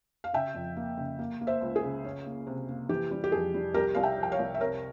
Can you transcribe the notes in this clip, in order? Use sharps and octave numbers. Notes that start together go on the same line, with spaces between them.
F5
C#3 E5 G5
F2
A#3
C#3
A#3
A#3
C5 E5
C#2
G#4
C#3
C#4
A#3
C3
A#3
E3 G4
G3
G4
F2 G#4
G3
C2 G4 A#4
C2 F5
E5 G5
F3
G5
C#5 F5
C2
E5
C3 A#4 C#5